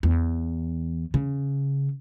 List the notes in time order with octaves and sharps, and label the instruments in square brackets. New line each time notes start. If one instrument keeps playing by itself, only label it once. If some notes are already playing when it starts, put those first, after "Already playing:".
[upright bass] E2
C#3